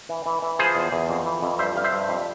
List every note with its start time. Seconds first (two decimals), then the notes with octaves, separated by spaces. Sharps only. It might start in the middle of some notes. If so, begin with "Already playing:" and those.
0.09 E3
0.26 E3
0.42 E3
0.59 F3 G#4 C5
0.75 E2
0.92 E2
1.10 F2
1.25 E3
1.42 F2
1.59 G2 C5 E5
1.76 G2 F5
1.84 C5 E5
1.93 G2
2.09 F2